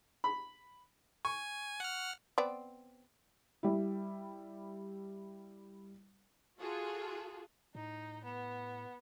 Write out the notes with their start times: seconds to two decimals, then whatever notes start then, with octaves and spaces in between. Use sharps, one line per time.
0.24 B5
1.25 G#5 C#6
1.80 F#5 F6
2.38 B3 C4 D5
3.63 G3 E4
6.60 F4 F#4 G#4 A4
7.75 A2 D#4
8.23 B3